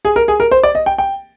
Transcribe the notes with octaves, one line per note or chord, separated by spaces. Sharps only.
G#4
A#4
G#4
A#4
C5
D5
D#5
G5
G5